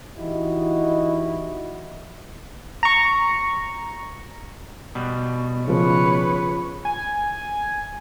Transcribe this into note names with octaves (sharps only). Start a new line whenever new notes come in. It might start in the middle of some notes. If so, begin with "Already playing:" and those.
E3 D#4 E4 F#4 G4 D#5
A#5 C#6
B2 G3
C#3 F3 B4 C#5
G#5